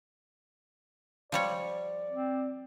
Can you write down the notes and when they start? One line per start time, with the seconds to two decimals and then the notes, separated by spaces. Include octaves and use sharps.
1.32 F3 G3 C#5 D5
2.10 C4